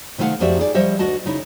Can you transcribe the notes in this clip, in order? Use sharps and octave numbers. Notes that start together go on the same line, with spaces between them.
C3 D#3 A3 A4 F5 F#5
F2 F3 F#4 G4 D5 E5
D#4 G#4 D5
F3 G3 C5 C#5 D#5 E5
D2 F#4 D#5 A5
C#3 D#4 E4